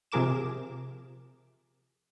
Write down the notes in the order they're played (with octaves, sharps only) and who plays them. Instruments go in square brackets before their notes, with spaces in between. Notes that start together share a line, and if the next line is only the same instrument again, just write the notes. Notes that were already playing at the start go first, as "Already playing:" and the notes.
[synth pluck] C3 F3 G#4 A#4 D6 E7